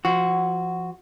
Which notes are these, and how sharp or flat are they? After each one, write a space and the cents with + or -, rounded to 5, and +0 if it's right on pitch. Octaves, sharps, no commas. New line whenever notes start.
F3 -15 F#4 +0